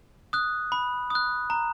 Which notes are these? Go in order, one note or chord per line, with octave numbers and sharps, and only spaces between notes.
D#6 F#6
B5
D#6 F#6
A#5